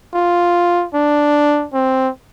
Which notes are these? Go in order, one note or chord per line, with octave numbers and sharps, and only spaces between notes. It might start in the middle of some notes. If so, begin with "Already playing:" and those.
F4
D4
C4